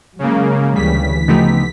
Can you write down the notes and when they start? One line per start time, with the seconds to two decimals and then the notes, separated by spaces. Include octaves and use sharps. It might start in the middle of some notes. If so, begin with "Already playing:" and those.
0.19 C#3 F#3 G#3 A#3
0.76 D2 C#3 E3 G3 B6
1.28 C#3 F3 A3 B3 D#4 G4